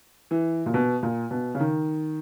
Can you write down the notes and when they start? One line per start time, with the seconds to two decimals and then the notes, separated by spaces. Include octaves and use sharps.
0.31 E3
0.66 A#2
0.74 B2
1.03 A#2
1.31 B2
1.55 C#3
1.60 D#3